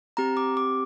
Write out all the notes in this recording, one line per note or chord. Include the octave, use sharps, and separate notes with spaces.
C4 G4 A#5
D6
D6